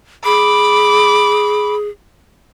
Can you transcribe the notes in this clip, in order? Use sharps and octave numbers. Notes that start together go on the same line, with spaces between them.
G#4 B5 D6